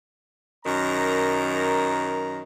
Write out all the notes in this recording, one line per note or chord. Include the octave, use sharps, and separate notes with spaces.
F#2 D#3 A#5